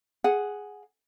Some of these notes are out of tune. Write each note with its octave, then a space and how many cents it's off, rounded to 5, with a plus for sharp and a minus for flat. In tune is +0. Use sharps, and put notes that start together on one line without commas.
G#4 +0 F#5 +0